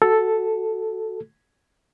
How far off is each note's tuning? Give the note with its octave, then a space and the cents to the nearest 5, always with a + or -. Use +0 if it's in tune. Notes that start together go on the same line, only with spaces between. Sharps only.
F#4 +10 A4 +0